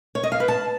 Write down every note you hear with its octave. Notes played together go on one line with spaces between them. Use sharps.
C#5
D#5
F5
B4
A5